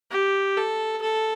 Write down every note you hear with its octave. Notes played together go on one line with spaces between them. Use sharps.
G4
A4
A4